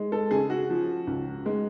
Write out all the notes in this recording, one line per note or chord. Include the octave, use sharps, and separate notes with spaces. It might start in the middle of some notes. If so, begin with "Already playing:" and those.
Already playing: G#3
A4
C#3 G#4
F#4
F3
C#2
G#3